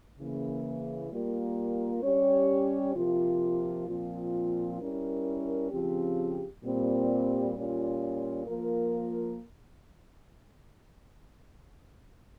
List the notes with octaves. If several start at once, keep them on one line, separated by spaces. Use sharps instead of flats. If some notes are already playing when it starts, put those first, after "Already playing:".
C#3 E3 A#3
G3 A#3 F4 A#4
G3 C#4 G4 C#5
C3 F3 A#3 F4
A#2 F3 C4 F4
G3 C#4 E4 A#4
C#3 F3 C4 G4
A#2 G3 C4
A#2 G3 C#4 F4
F3 A#3 F4 A#4